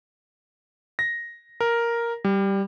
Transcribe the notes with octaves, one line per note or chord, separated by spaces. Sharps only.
A#6
A#4
G3